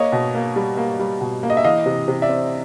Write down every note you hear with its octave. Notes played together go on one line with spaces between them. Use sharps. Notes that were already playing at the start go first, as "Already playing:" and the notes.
Already playing: A#3 C#5 D#5
B2
A#3
G3
A#3
G3
B2
A#3
D#5
E5
E3 D#5 F5
C3
C3
D5 E5
C4